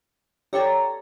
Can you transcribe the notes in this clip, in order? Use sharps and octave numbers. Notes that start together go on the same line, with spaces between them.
G4 A4 C#5 D5 A#5